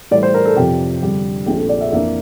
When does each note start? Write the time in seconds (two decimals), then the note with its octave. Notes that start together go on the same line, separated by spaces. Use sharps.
0.11 A2 E3 G3 D5
0.23 C5
0.34 A#4
0.45 A4
0.56 F2 C3 F3 G4
1.01 F2 D3 G3
1.46 A#1 A#2 A3 C4 F4 G4
1.58 A4
1.69 D5
1.81 E5
1.91 F2 E3 A#3 D4 E5